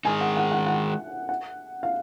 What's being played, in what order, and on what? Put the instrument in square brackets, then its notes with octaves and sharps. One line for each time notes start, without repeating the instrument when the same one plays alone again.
[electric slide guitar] D#3 G#3 D#4 [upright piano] G#5
[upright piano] F#5
F#5
F#5
F#5
F#5
F5